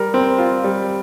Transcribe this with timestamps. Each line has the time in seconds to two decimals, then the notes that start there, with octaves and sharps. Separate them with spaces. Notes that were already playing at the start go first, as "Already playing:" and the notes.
Already playing: G3 A#4
0.14 C4
0.38 F4
0.64 G3